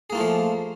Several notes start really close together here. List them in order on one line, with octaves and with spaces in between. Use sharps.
G#4 A#3 F4 A3 F3